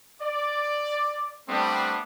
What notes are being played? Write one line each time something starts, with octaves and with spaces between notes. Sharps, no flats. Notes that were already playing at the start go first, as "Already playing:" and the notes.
D5
G3 A3 B3 C4 D4